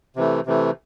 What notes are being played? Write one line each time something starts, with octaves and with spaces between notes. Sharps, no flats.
C3 E3 A3
C3 E3 A3